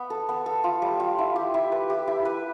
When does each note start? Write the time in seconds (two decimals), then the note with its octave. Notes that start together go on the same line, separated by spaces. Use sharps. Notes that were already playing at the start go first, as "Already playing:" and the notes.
Already playing: B3
0.10 A4
0.29 B3
0.46 A4
0.64 F4
0.82 G3
1.00 F4
1.18 E4
1.36 G4
1.54 E4
1.72 B4
1.90 G4
2.07 E4
2.25 B4